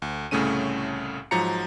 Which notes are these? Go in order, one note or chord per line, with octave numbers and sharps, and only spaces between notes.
D2
C2 A2 C#3 A3 C#4 D#7
G#2 F3 F#3 A#5 C#7